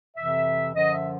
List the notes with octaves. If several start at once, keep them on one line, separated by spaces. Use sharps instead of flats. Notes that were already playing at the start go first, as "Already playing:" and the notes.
F2 C3 E3 E5
F#2 D3 F3 D#5
E5